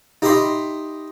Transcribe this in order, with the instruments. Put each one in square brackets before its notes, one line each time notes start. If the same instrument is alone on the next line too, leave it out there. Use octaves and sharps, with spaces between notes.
[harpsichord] D#4 G4 D#5 E5 B5 C6